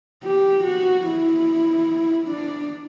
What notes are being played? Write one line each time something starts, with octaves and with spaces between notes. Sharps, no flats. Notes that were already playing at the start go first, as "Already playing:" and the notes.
G4
F#4
E4
D4